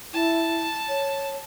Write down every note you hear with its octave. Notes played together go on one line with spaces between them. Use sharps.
E4 A5
C#5